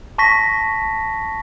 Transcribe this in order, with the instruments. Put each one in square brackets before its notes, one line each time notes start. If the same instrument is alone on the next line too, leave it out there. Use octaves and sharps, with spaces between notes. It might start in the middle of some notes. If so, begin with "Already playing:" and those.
[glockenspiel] A5 C#6 A#6 B6